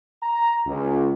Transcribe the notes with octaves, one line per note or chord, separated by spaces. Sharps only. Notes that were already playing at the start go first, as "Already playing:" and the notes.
A#5
C#2